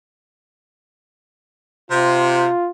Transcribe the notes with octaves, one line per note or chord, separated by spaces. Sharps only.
C3 F4